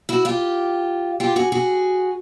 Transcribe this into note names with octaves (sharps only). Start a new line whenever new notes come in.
E4 F#4
F4 G4
F4 G4
F#4 G#4
F#4 G#4